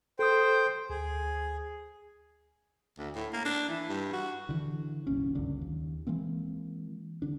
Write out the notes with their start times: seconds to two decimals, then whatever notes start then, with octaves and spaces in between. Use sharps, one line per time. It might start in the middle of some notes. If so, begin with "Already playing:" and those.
0.19 A4 C5 G5 D#6
0.90 D2 G#4
2.98 D2
3.15 A2
3.33 A#3
3.45 D4
3.68 E3
3.88 G2
4.13 F#4
4.49 D3 E3
5.07 G1 C2 A#2 C#4
5.35 G1 C#2 F#2 D3
5.61 D#2
6.07 E3 G#3 A#3 C4
7.22 D3 D4